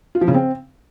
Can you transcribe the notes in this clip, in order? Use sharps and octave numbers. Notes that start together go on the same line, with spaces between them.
F4
F3
C#3
C4